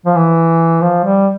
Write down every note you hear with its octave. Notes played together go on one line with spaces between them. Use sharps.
F3
E3
F3
G3